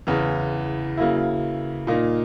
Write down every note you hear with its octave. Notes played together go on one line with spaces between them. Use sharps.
E2 C#3 E3
C#3 F#3 A#3 E4
A#2 A#3 D#4